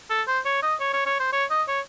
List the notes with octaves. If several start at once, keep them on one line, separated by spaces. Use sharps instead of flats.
A4
C5
C#5
D#5
C#5
C#5
C#5
C5
C#5
D#5
C#5